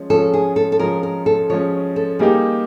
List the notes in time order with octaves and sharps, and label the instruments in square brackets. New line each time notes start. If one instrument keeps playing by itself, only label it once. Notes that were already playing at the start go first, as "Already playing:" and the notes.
Already playing: [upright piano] F3 G#3 C#4
[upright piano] F3 G#3 C#4 [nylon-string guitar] A4
[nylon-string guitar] G#4
A4
A4
[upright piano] F3 G#3 C#4 [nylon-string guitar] A#4
[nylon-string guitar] A#4
A4
[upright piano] F3 G#3 C#4 [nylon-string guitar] C#5
[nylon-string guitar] A4
[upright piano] G3 A#3 D#4 G4 [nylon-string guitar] G#4